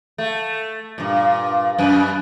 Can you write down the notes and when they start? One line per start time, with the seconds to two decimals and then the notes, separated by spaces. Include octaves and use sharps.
0.18 A3
0.98 G2 A#2
1.78 F#2 B4